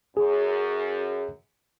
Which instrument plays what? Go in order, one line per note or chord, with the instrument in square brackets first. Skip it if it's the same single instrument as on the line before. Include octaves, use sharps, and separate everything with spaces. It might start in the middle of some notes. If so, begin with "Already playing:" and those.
[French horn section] F#2 [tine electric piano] G#4